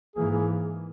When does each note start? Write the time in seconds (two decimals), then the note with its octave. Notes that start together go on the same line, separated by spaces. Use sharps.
0.16 G#2 E3 A#3 G#4
0.31 G#4